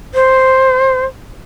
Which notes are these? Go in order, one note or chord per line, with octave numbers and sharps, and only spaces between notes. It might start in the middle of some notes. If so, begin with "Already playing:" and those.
C5